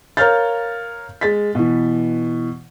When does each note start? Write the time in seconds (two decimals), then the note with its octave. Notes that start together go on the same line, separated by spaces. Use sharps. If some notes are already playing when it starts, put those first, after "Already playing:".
0.17 A#4 C#5 F5 F6 G6 A6
1.21 G#3 A6 B6
1.55 B2 E3